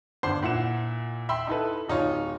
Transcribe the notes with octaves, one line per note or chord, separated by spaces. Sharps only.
G1 D4 C5 C6 C7
A#2 E4 F#5 E7
E5 G5 B5 C6
D#4 E4 A4 B4
D1 D#4 F4 C#5